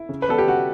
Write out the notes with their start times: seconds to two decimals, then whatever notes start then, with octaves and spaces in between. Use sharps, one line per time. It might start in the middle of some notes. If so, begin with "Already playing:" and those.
Already playing: E4
0.09 C#3
0.22 B4
0.29 G3 B3 A4
0.38 G4
0.47 C#3 F#4